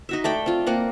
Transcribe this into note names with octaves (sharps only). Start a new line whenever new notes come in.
D#4 F#4 E5
A3 D5 G5
C4 F4
A#3 C4 F#5